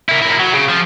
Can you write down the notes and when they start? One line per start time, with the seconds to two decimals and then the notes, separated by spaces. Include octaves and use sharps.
0.09 E4 A#4
0.22 A#3 E4
0.40 F#3
0.54 C#3
0.69 F3